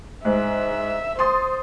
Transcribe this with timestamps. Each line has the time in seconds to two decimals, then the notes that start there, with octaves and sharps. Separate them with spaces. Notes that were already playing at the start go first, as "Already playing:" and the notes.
0.25 G#2 E5
1.19 C5 C6 D#6 A6